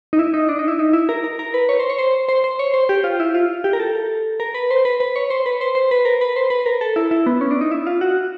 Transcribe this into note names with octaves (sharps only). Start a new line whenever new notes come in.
D#4
E4
D#4
D4
D#4
E4
D#4
E4
A#4
A#4
A#4
B4
C#5
C5
C#5
C5
C5
C5
C#5
C5
G4
F4
E4
F4
G4
A#4
A4
A#4
B4
C5
B4
B4
C#5
C5
B4
C5
C5
B4
A#4
B4
C5
B4
A#4
A4
E4
E4
B3
C#4
D4
D#4
E4
F4
F#4